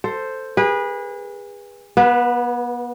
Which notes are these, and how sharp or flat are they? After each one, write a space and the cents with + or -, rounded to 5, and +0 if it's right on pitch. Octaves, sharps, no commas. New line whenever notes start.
A4 +10 C5 +0
G#4 -35 B4 -25
B3 -35 B4 +0